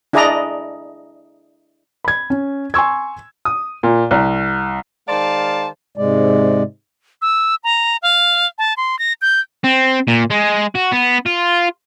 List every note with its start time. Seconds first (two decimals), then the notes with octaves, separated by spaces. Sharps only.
0.13 D4 E4 G#4 D5 D#5 A#5
2.05 B5 G#6
2.30 C#4
2.74 G#5 C6 C#6 E6 G#6
3.45 D#6
3.83 A#2
4.11 C2
5.07 D#3 G#3 C5 D5 F5 A5
5.97 G#2 C3 G#3 D5
7.22 E6
7.64 A#5
8.02 F5
8.58 A5
8.77 C6
8.99 A#6
9.22 G6
9.64 C4
10.08 A#2
10.30 G#3
10.75 F#4
10.92 B3
11.26 F4